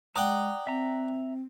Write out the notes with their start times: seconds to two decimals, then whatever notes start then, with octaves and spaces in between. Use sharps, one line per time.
0.16 G#3 D5 F#5 G5 A#5 D#6
0.67 C4 E5 A#5